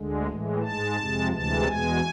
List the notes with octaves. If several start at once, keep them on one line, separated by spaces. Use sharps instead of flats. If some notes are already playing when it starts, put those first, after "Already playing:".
Already playing: D2 D3 G#3
A2 E3 G#3
G#2 G#3 A5
F2 C3 G#3
D2 C3 E3 G#3 A5
E2 B2 G#3 G#5